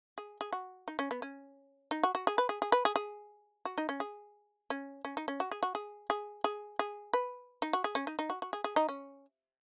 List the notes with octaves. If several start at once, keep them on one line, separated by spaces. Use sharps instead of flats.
G#4
G#4
F#4
D#4
C#4
B3
C#4
D#4
F#4
F#4
G#4
B4
G#4
G#4
B4
G#4
G#4
F#4
D#4
C#4
G#4
C#4
C#4
D#4
C#4
F#4
G#4
F#4
G#4
G#4
G#4
G#4
B4
D#4
F#4
G#4
C#4
D#4
D#4
F#4
F#4
G#4
G#4
D#4
C#4